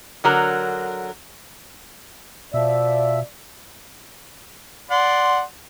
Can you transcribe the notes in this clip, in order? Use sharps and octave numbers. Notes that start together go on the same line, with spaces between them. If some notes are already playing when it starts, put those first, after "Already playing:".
D3 F#3 A#4
B2 F3 D5 E5
D5 F#5 C6